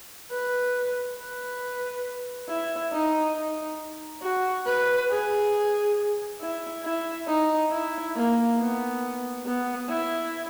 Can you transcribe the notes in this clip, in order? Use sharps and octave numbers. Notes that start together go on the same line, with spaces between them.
B4
B4
E4
D#4
D#4
F#4
B4
G#4
E4
E4
D#4
E4
A#3
B3
B3
E4